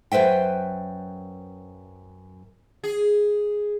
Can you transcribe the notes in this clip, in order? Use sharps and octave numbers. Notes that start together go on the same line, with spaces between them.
F#2 B4 C5 E5 G5
G#4